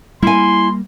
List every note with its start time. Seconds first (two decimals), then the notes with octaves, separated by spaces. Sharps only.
0.23 G3 A#3 E4 G#5 C6